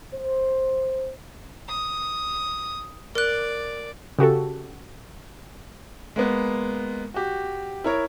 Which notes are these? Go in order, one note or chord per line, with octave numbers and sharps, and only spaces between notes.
C5
D#6
A#4 D5 F#6
C#3 F#4 G4 A4
G#3 A#3 B3
F#4 G4
E4 A#4 C#5